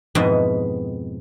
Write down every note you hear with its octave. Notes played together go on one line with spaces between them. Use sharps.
F2 G#2 B2 E4 D#5